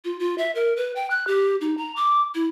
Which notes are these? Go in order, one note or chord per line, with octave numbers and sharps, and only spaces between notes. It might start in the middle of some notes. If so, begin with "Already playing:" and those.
F4
F4
E5
A#4
B4
G5
F#6
G4
D#4
A#5
D6
E4